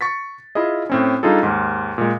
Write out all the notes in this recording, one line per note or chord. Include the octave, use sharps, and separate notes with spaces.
C#6 A6 B6
E4 F4 G#4 D#5
A2 C4 C#4
G3 D4 D#4 F4 G#4 A4
D#2 G#2
A#2 G#3